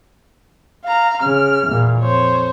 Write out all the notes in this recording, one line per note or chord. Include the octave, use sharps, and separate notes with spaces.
F5 A#5
C#3 F6
E2 A#2
F2 C5 C#5